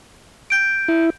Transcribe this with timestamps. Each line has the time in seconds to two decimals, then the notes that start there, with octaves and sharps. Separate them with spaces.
0.50 G6 D7
0.88 E4